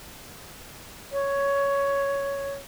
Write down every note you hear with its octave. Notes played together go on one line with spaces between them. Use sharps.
C#5